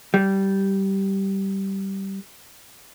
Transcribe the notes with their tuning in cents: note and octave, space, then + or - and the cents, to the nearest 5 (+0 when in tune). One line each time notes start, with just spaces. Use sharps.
G3 -10